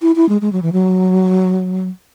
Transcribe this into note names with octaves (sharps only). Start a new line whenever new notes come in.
E4
E4
G#3
G#3
F#3
E3
F#3